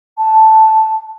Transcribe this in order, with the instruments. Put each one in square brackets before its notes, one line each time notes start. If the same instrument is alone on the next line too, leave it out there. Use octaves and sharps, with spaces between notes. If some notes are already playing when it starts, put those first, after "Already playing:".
[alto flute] A5